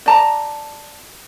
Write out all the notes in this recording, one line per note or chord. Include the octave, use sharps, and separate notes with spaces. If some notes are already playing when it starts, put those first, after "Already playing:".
D5 A5 A#5